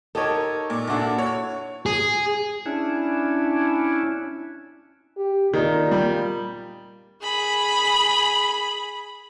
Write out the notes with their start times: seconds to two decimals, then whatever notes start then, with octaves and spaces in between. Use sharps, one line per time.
0.15 D#4 G4 A4 A#4 C#5
0.70 A#2
0.87 A#2 D4 E4 F#4 A4
1.18 C#5
1.86 G#4
2.66 C#4 D4 E4
5.17 G4
5.54 A#2 D#3
5.91 G3
7.23 G#4 B5